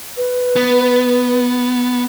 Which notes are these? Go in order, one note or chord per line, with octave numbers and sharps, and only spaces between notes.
B4
B3